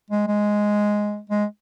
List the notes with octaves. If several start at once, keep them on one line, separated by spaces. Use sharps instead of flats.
G#3
G#3
G#3